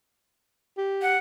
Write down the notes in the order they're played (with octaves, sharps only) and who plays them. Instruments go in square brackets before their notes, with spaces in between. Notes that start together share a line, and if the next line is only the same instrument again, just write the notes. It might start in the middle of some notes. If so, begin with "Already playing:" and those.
[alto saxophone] G4
[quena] F#5